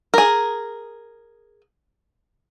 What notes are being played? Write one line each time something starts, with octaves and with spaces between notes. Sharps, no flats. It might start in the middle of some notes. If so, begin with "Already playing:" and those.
G#4 A#4